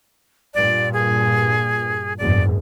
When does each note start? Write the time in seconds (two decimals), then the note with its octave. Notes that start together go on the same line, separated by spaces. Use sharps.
0.54 G2 A#2 D5
0.93 G#4
2.18 F#1 E2 G#2 D5